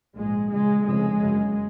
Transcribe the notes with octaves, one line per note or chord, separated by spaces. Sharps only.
A#1 G#2 G#3
C#2 C#3 G#3
F1 F2 C#3 G#3
F#1 F#2 C#3